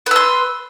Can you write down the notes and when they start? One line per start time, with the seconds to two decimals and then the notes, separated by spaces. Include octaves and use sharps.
0.06 B4
0.11 E6
0.16 C6